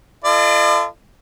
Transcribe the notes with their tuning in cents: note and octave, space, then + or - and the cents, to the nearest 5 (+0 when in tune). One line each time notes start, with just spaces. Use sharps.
F4 -40 A4 +0 D5 +45